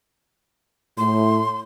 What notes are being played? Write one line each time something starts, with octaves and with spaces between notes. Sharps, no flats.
A2 C6